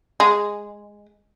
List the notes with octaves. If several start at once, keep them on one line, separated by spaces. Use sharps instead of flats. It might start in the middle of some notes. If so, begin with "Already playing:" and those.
G#3